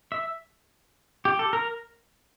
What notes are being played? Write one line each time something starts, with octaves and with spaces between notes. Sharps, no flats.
E5
G4
A4
A#4